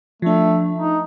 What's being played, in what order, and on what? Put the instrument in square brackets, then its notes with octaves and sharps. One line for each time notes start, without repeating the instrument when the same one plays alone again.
[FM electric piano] F3 D4 [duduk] A3
[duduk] D#4